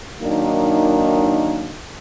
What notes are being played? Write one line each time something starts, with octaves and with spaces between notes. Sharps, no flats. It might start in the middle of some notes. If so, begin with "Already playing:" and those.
D#3 F#3 A#3 D4 D#4